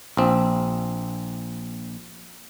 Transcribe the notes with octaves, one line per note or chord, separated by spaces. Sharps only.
A#1 C4